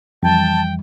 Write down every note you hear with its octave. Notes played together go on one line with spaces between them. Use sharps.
F2 E3 G3 G5 A5